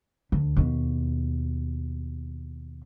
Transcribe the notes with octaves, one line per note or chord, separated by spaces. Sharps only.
D2
D#2 B2